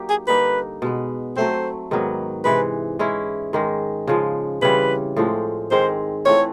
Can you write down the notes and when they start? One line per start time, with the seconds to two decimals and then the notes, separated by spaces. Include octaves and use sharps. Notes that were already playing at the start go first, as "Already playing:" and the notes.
Already playing: F#3 A#3 D#4 G4
0.10 G#4
0.27 D3 G3 A#3 D#4 B4
0.82 B2 G#3 B3
1.36 F#3 A3 C4 C5
1.91 G#2 D#3 F#3 B3
2.44 C3 E3 G#3 B4
2.99 G#3 C#4 E4
3.53 G#2 D#3 G#3
4.07 C#3 F3 G#3
4.62 C#3 E3 G3 C4 B4
5.16 A2 F3 G#3 C4
5.71 G#2 D#3 G#3 C4 C5
6.25 E3 A3 C4 F4 C#5